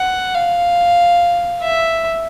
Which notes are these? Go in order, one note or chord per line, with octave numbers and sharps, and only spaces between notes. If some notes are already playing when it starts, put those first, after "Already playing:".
Already playing: F#5
F5
E5